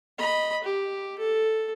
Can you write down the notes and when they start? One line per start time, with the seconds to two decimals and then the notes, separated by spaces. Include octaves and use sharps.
0.19 D#5 B5
0.64 G4
1.19 A4